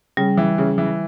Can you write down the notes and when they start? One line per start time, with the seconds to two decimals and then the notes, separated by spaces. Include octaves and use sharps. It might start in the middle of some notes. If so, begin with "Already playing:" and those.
0.17 C#3 G3
0.37 E3
0.58 C#3
0.78 E3